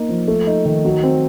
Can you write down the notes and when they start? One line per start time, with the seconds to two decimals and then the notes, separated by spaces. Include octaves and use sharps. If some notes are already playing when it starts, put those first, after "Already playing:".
Already playing: A#3 D#4
0.09 F3
0.28 A3
0.47 D#4
0.65 D#3
0.85 F#3
1.03 C4